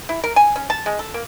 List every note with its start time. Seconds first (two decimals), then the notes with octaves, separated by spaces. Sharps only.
0.09 E4
0.24 A#4
0.36 G#5
0.56 C#4
0.70 A5
0.86 G#3
0.99 A4
1.14 A#3